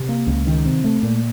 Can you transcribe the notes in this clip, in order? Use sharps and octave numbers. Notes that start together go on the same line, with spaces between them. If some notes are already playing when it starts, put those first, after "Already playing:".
Already playing: C3
A#3
C#2
D#3
C3
A3
A#2